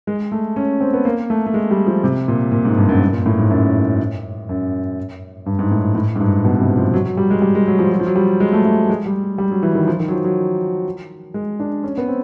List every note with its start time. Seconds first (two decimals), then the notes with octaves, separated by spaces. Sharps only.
0.07 G#3
0.32 A3
0.56 C#4
0.81 C4
0.93 B3
1.05 A#3
1.30 A3
1.46 A3
1.54 G#3
1.71 G3
1.86 F3
2.04 C3
2.28 A#2
2.52 A#2
2.65 G#2
2.77 G2
2.89 F#2
3.01 G2
3.13 A#2
3.26 A2
3.38 G#2
3.50 F#2
4.49 F#2
5.46 G2
5.59 G#2
5.71 A2
5.95 A2
6.16 G#2
6.20 G2
6.44 B2
6.60 C3
6.77 F3
6.93 F#3
7.06 F#3
7.17 G3
7.30 G#3
7.42 G3
7.55 G#3
7.67 F#3
7.79 F3
7.92 F#3
8.00 F3
8.06 F#3
8.16 G3
8.40 G#3
8.53 A3
8.65 A3
8.90 G#3
9.06 G3
9.38 G3
9.51 F#3
9.63 E3
9.75 D#3
9.87 F3
10.00 D#3
10.08 F#3
10.12 F3
10.24 F#3
11.34 G#3
11.59 D4
11.84 C#4
11.97 B3
12.08 C4